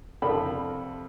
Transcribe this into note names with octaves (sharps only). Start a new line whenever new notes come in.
F2 C3 D4 A4 A#4 B5